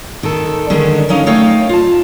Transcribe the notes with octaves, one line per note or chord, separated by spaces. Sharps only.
D#3 A4
D3 D#3 G#3 C#4
F#3 C#4 D#4 F5
A3 D#4 C#5 F5 G5
F4 A5